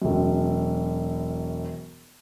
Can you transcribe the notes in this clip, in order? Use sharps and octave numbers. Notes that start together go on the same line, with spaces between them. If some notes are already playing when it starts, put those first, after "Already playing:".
E1 F#2